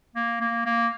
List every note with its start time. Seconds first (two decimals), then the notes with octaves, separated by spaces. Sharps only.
0.16 A#3
0.40 A#3
0.65 A#3